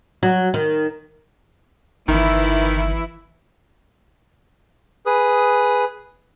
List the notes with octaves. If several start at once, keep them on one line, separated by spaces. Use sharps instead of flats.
F#3
D#3
G1 D#3 E3 E4
G#4 B4 D#6